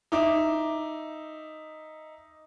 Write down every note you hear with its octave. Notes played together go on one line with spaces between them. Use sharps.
D#4 E5 D6